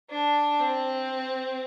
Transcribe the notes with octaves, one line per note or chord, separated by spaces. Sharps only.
D4
C4